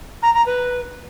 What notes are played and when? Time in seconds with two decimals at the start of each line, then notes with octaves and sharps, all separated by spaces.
0.22 A#5
0.34 A#5
0.46 B4